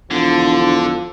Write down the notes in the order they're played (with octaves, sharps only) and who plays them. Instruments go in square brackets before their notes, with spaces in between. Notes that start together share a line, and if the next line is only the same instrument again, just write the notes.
[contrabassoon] E1 [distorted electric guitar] D3 [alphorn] F3